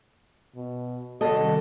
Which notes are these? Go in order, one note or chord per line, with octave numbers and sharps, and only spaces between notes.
B2
C3 D#3 G3 F#4 A4 D#5